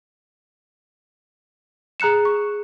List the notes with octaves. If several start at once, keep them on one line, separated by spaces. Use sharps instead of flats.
G#4 A#5 F#6 C#7 E7
C#6